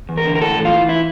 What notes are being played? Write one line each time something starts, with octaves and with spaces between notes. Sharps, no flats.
E2
A#4
D3
A#4
A2 A4
E3
F4
E3
E4